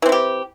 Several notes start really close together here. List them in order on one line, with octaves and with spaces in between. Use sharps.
E3 C4 E4 G4